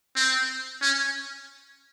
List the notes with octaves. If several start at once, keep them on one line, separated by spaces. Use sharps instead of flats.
C4
C#4